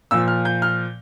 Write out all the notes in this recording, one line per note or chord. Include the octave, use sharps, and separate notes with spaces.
A#2 F3 E6
F6
G6
F6